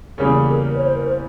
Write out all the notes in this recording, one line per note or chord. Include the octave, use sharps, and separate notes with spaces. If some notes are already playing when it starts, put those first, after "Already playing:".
E2 C#3 G3 A#3 C#4 G#4
A#4
C#5
C5
A#4
C5